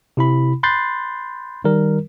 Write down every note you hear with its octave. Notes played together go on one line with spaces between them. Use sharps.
C3 E4 B5
B5 C6 F#6 G6 A6 C7
D#3 G3 A#4